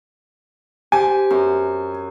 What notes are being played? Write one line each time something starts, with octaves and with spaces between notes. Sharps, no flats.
G4 C5 G#5
F#2